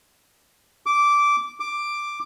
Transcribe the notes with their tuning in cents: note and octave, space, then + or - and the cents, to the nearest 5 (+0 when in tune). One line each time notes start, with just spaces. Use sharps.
D6 -10
D6 +5